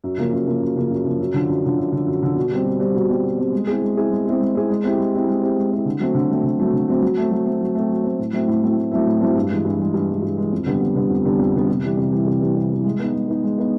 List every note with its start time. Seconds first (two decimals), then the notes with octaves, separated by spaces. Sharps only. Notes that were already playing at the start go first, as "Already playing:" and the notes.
0.04 F#2
0.18 C#3 F3 A#3
0.32 F#2
0.47 C#3 F3 A#3
0.61 F#2
0.76 C#3 F3 A#3
0.90 F#2
1.05 C#3 F3 A#3
1.19 F#2
1.34 D3 F3
1.49 F#2
1.64 D3 F3
1.77 F#2
1.92 D3 F3
2.07 F#2
2.22 D3 F3
2.36 B2
2.51 G3 C4
2.65 B2
2.80 G3 C4
2.94 B2
3.09 G3 C4
3.23 B2
3.38 G3 C4
3.53 G#3
3.67 C4 E4 G#4
3.82 G#3
3.96 C4 E4 G#4
4.11 G#3
4.25 C4 E4 G#4
4.40 G#3
4.55 C4 E4 G#4
4.70 G#3
4.84 C4 E4 G4
4.98 G#3
5.12 C4 E4 G4
5.27 G#3
5.42 C4 E4 G4
5.57 G#3
5.71 C4 E4 G4
5.85 D3
6.00 F#3 A3 C4
6.15 D3
6.30 F#3 A3 C4
6.44 D3
6.58 F#3 A3 C4
6.73 D3
6.88 F#3 A3 C4
7.02 F#3
7.17 A3 C4
7.31 F#3
7.46 A3 C4
7.61 F#3
7.75 A3 C4
7.89 F#3
8.04 A3 C4
8.19 A2
8.33 F#3 A3 C4 E4
8.48 A2
8.62 F#3 A3 C4 E4
8.77 A2
8.92 F#3 A3 C4 E4
9.06 A2
9.20 F#3 A3 C4 E4
9.35 G2
9.49 E3 G#3
9.65 G2
9.79 E3 G#3
9.94 G2
10.08 E3 G#3
10.22 G2
10.38 E3 G#3
10.52 F2
10.66 D3 G3 B3
10.82 F2
10.95 D3 G3 B3
11.10 F2
11.25 D3 G3 B3
11.39 F2
11.54 D3 G3 B3
11.68 C3
11.83 E3 G3
11.97 C3
12.12 E3 G3
12.27 C3
12.41 E3 G3
12.56 C3
12.70 E3 G3
12.84 G#3
12.99 B3 D#4
13.14 G#3
13.28 B3 D#4
13.43 G#3
13.58 B3 D#4